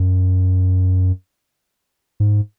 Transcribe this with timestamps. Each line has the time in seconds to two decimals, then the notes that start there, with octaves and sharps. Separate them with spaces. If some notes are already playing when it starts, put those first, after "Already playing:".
Already playing: F#2
2.20 G#2